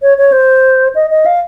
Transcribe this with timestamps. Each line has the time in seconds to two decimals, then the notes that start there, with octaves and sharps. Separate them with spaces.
0.02 C#5
0.18 C#5
0.32 C5
0.95 D#5
1.10 D#5
1.26 F5